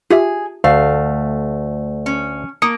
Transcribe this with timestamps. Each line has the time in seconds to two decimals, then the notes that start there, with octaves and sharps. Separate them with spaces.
0.11 F4 G4 G#4 E5
0.64 D2 A3 F5
2.06 C#4
2.62 A#3 D#6 C#7